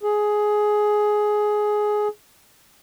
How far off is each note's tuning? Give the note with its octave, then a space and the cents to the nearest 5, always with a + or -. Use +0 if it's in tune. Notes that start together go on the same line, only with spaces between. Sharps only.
G#4 +10